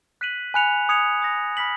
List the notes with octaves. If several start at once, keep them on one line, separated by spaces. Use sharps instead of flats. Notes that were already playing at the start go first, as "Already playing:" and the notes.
F#6 B6 D#7 F#7
G#5 B5 F#6 C#7 F7
D#6 G#6 C#7 F7
D#6 A#6 F7
B5 F6 B6 F#7